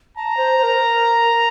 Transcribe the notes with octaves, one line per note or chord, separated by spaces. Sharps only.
A5 A#5
C5
C5
A#4